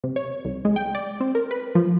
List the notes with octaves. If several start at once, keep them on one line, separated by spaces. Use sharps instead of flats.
C3
C#5
C2
G#3
G5
D5
C4
A#4
B4
F3